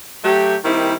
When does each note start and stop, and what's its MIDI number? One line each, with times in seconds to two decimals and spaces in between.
0.24 0.56 54
0.24 0.56 57
0.24 0.56 67
0.65 0.93 51
0.65 0.93 55
0.65 0.93 58
0.65 0.93 60
0.65 0.93 63
0.65 0.93 64